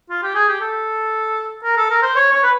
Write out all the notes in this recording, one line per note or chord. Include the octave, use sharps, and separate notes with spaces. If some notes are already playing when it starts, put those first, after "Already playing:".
F4
G4
G#4
G4
A4
A#4
A4
A#4
C5
C#5
C#5
B4